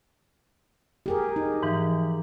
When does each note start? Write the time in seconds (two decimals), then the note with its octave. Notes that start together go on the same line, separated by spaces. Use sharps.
1.06 G4 G#4 A#4
1.36 D#4
1.63 G#2 E3 F3